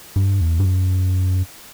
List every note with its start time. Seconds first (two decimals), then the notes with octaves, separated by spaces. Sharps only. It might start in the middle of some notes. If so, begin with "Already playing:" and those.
0.16 G2
0.41 E2
0.60 G2
0.65 F#2